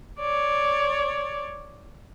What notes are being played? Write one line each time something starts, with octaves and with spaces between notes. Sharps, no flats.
C#5 D5